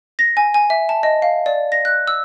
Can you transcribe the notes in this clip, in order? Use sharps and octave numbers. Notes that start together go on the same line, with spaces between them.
A#6
G#5
G#5
E5
A5
D#5
F5
D5
A#6
F#6
E6